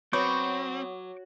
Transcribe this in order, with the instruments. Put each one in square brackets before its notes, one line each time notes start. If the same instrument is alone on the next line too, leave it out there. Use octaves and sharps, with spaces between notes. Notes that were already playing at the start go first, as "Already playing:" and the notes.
[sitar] F#3 [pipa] B3 [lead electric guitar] C4 [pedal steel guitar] C#6 D6 G6